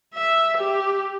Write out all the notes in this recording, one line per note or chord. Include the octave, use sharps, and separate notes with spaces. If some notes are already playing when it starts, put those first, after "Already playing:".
E5
G4